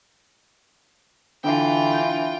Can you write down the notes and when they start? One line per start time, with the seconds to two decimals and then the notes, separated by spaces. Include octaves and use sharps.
1.44 D3 E3 F4 G5